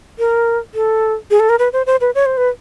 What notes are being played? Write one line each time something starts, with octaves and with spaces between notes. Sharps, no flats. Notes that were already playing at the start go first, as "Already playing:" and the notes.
A#4
A4
G#4
A4
A#4
B4
C5
C5
B4
C#5
C5
B4